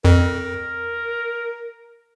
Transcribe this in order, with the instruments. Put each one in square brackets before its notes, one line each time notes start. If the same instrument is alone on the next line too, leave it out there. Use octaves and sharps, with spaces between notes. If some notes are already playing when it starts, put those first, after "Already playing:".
[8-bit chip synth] F2 [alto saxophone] A#4